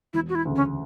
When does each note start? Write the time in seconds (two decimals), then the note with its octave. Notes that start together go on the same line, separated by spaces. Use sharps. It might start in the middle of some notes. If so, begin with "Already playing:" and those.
0.14 E1 E4
0.29 F#4
0.35 E4
0.45 D2 C#3
0.56 C#4